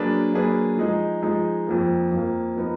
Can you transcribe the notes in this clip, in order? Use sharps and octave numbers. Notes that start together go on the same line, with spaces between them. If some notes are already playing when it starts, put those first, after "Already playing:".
Already playing: F#3 A#3 D4 G#4 B4
F#3 A#3 D4 G#4 B4
F3 G#3 D#4 G#4
F3 G#3 D#4 G#4
F2 F3 A#3
F2 F3 A#3
F3 B3 D#4 A#4